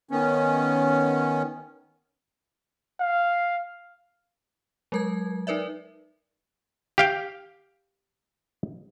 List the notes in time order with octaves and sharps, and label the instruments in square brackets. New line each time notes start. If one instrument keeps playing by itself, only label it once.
[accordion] D#3 B3 C#4
[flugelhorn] F5
[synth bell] F#3 G#3 A#4 A5 G#6
D#4 A#4 B4 D5 E5
[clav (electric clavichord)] G4 F5 G5